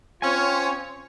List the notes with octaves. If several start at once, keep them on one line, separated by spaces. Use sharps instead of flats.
C4 C#4 F4 C#5 G#5